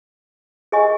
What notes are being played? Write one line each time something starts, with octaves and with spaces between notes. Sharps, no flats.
G#4 D#5 G#5 C#6